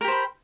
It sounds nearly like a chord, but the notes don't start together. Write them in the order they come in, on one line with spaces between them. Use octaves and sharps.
A#4 G4 C5 B5